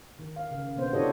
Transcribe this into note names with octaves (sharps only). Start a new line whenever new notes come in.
D#3
F5
C#3
B2 D3 B3 C5
D4 E4 G4 A4 C#5 D#5